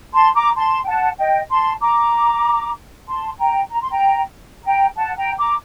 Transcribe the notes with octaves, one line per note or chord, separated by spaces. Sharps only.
A5 C6
A#5 D6
A5 C6
G5
F#5 A5
D#5 G5
A5 C6
A#5 D6
A5 C6
G5 A#5
A#5
C6
G5 A#5
G5 A#5
F#5 A5
G5 A#5
A#5 D6